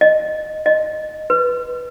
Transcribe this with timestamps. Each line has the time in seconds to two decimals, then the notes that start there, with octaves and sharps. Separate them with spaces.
0.01 D#5
0.66 D#5
1.30 B4